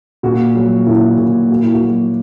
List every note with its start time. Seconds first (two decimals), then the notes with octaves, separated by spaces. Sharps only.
0.23 A#2 F#4
0.55 F#3
0.87 A#2 E4
1.18 A#2
1.50 A#3 F#4
1.60 E4
1.73 F#4
1.81 F#3